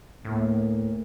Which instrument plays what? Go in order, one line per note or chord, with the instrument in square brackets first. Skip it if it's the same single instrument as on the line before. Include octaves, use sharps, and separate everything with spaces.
[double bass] D2 A#3 [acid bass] A2